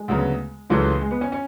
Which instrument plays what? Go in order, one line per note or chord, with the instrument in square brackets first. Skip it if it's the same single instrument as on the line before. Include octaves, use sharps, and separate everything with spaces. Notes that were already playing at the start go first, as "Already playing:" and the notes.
Already playing: [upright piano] G#3
[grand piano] D2 C#3 F#3 B3
[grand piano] C#2 C#3 E3 A3 C#4 [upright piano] F#3
[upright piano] G#3
B3
C#4
C#4